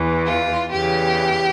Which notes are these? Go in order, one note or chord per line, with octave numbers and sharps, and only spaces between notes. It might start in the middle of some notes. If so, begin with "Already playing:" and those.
Already playing: E2 E3
F4
E2 C#3 E3 G4